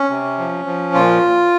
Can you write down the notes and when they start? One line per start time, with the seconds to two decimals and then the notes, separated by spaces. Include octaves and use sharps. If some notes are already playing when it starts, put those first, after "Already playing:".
Already playing: C#4
0.10 C3
0.38 F3
0.66 F3
0.94 A#2 F4